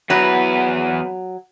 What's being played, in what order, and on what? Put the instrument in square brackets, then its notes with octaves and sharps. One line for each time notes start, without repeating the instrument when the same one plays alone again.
[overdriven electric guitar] E2 B4 [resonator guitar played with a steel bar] F#3